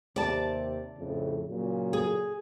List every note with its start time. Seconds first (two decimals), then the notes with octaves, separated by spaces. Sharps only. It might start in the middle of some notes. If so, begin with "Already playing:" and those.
0.16 D#2 C3 D5 A5
0.98 F2 A2 C#3
1.48 A#2 C#3 F#3
1.93 G#4